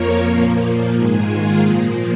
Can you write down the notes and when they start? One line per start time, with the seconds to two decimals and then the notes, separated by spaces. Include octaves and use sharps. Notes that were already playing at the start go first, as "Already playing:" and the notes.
Already playing: F2 F3 A#3 A#4 C#5
0.25 A#2 F3 A#3
0.93 G#2 D#3 G#3 G#4
1.27 F4
1.61 A#2 F3 A#3